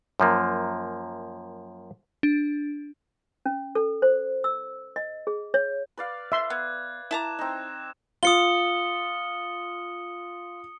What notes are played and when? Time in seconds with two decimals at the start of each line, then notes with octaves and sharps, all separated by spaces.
0.20 F#2 F3 A#3
2.23 D4
3.46 C#4
3.75 A4
4.02 C5
4.44 E6
4.96 D#5
5.27 G#4
5.54 C#5
5.97 B4 D5 F5
6.32 E5 C6
6.50 B3 F#6 G#6
7.11 E4 A5 A#5 D6 E7
7.39 C4 D#4
8.23 F4 D#6 C#7 G7